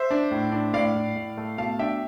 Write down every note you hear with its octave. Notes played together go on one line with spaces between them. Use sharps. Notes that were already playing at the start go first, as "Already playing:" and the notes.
Already playing: C5 E5
D4
A2
D4
A2 D5 F5
A2
A2
A3
B2 F5 A5
D4 E5 G5